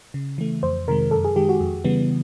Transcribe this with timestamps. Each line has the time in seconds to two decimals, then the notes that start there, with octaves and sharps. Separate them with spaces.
0.14 C#3
0.38 E3 A3
0.63 F2 C5
0.88 C3 D#3 G#3 A#4
1.11 F#2 A4
1.24 G#4
1.36 D#3 G#3 G4
1.49 F#4
1.60 F2
1.84 C#3 E3 G3 B3